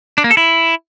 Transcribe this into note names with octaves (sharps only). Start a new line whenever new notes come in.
D4
A#3
A4
E4